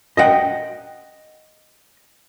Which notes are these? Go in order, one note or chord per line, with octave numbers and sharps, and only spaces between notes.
D#5 E5 F#5 G5